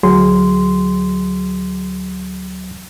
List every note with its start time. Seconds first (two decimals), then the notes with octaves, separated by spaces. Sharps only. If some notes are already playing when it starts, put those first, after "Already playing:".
0.03 D2 F#3 G#4 C6